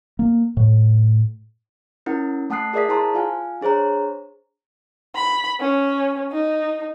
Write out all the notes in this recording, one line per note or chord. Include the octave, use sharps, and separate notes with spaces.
A#3
A2
C#4 E4 A#4 F#5
A3 F#5 A5 D#6 F#6 C7
G#4 A#4 D5 E5 D#6 B6
E4 G#4 C5 A5 A#5 C6
F4 F5 G#5
D4 G#4 C5 C#5 A#5
B5
C#4
D#4